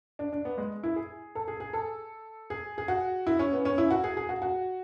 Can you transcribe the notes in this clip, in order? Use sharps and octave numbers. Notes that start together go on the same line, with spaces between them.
D4
D4
B3
G#3
E4
G#4
A4
G#4
G#4
A4
G#4
G#4
F#4
E4
C#4
B3
C#4
E4
F#4
G#4
G#4
F#4
F#4